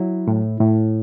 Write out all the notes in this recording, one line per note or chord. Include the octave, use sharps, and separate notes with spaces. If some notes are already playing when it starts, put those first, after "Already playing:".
Already playing: F#3 E4
A2
A2